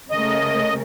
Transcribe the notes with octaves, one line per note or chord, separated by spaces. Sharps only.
C#3 A3 A#4 D#5